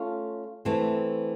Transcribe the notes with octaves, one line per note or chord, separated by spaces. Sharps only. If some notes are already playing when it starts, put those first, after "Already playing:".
Already playing: A3 C#4 F4
E3 A3 C4